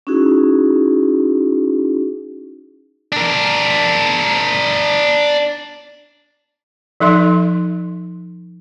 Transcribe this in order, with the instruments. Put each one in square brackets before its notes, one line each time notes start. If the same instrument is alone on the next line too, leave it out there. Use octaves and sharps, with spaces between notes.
[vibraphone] C#4 D#4 E4 F#4 G#4
[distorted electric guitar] D4 A#4
[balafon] F3 D#4 A4 E5 C6